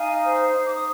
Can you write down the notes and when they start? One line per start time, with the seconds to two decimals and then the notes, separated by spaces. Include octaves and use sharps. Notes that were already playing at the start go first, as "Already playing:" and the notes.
Already playing: D#4 F5 G#5
0.23 C5
0.52 D#4
0.65 D6
0.73 D#6